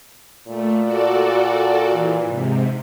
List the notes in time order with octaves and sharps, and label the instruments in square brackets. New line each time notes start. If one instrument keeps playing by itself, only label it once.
[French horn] A#2 [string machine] A3
[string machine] F#4 A4 D5
E3
G#2 C3